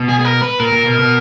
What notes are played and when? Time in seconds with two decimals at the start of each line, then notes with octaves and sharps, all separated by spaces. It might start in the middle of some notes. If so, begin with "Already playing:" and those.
Already playing: B2
0.08 G#4
0.19 G#4
0.24 A#4
0.42 B4
0.60 A#2 A#4
0.72 A#2
0.85 B2
0.99 B2